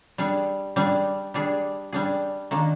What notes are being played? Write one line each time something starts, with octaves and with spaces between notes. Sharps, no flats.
G3 D4 G#4
G3 D4 G#4
G3 D4 G#4
G3 D4 G#4
D#3 A#3 D4